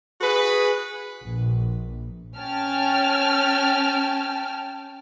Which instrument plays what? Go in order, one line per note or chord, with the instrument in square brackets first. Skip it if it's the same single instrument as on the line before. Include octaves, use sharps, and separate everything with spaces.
[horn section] F#4 G#4 B4
[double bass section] A#1
[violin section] C#4 G5 A5 F6